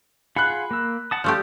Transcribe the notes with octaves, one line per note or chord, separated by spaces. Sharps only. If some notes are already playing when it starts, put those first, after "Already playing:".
F4 G#4 F#5 B5 F#6
A#3 E6
F#5 A5 D#6
F3 A3 G4 D5